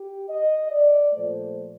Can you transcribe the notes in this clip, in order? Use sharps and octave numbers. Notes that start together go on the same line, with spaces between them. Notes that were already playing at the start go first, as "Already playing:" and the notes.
Already playing: G4
D#5
D5
A#2 F3 A3 C5